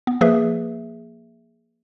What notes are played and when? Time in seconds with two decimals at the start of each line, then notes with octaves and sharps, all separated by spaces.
0.07 B3
0.21 F3 A#3 G#4 B4 E5